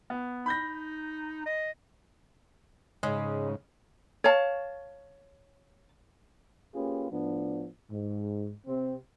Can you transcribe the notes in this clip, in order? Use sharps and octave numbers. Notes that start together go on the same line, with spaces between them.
B3
D#4 B5 G6 A#6
D#5
G#2 C#3 G#3
C#5 F5 A5
A#3 C#4 F4 G4 G#4 B4
A2 F3 B3 D4
G#2
C3 C4